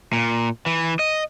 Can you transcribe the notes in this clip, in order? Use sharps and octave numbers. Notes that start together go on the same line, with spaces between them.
A#2
E3
D#5